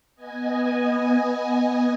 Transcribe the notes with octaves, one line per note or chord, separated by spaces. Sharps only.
B3 D#5 G#5